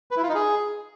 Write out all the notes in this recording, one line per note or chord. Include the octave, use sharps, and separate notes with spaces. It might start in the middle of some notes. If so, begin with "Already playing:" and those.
B4
E4
F4
D#4
G#4